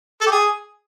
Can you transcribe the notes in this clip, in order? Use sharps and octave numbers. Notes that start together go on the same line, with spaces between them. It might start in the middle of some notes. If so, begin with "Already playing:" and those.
A4
G4
G#4